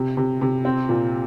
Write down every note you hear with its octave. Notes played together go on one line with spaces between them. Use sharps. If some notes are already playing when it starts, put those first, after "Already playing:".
Already playing: C3
C3
C3
C4
A#2